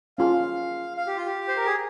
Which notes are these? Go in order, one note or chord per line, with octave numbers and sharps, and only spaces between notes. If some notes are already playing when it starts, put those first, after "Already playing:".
C#4 F4 G#4 F5
F5
G4
F4
G4
C5
A#4
G#4